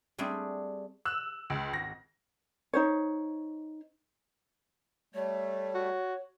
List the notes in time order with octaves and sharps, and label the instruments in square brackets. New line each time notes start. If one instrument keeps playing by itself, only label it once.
[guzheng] G3 A3 C4 D4 G#4
[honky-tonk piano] E6 F#6
C#2
G#1 A#6
[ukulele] D#4 C5 C#5
[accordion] G3 A3 [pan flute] C#5
[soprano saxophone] F#4